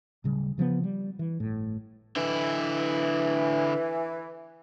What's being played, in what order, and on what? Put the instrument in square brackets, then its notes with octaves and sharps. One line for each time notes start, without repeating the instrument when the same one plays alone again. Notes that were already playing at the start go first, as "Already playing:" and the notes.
[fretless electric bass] D1 C#3 G3
C#3 F3 G3 B3
G3
E3
G1 A2
[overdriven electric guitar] D3 E4 [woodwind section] E3